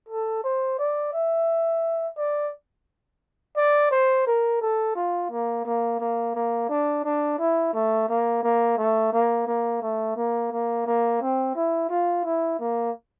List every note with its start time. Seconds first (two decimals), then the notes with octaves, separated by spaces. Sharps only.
0.09 A4
0.44 C5
0.79 D5
1.13 E5
2.18 D5
3.57 D5
3.91 C5
4.26 A#4
4.61 A4
4.95 F4
5.31 A#3
5.65 A#3
5.99 A#3
6.35 A#3
6.69 D4
7.04 D4
7.39 E4
7.73 A3
8.09 A#3
8.43 A#3
8.78 A3
9.13 A#3
9.47 A#3
9.82 A3
10.17 A#3
10.52 A#3
10.86 A#3
11.21 C4
11.56 E4
11.90 F4
12.25 E4
12.60 A#3